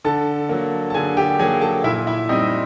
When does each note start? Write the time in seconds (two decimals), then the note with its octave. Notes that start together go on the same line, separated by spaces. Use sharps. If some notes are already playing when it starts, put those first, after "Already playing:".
0.05 D3 A4 A5
0.49 F#3 A#3
0.90 A5
0.94 D3 G#4 G#5
1.17 G4 G5
1.39 F#3 G#4 G#5
1.42 A#3
1.62 A4 A5
1.84 A#2 E4 E5
2.07 E4 E5
2.29 G3 C4 D#4 D#5